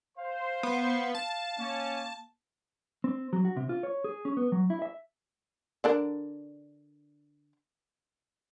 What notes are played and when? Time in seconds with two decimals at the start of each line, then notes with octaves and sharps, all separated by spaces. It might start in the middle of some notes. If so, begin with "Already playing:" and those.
0.18 C5 F5 C6
0.63 B3
1.15 A5
1.59 A#3 C#4
3.04 C4
3.33 F#3
3.45 F#4
3.57 C3
3.69 F4
3.83 C#5
4.04 G#4
4.25 C#4
4.37 B3
4.52 F#3
4.70 E4
4.82 E5
5.84 D3 D4 A#4